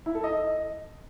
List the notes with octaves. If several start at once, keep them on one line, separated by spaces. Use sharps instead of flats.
E4
A4
D#5